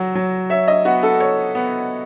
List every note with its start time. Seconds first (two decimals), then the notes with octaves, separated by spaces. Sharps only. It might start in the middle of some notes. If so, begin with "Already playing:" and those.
Already playing: F#3 F#4
0.15 F#3
0.50 C#5 E5
0.68 D#5
0.85 B3 F#4
1.03 A4
1.20 C#5
1.55 B3